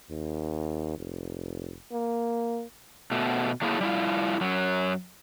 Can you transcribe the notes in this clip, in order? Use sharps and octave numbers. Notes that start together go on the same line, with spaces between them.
D#2
F1
A#3
B2 A3
F#3 A3 A#3 E4 G#4
G3 E4 F4
F#2 F#3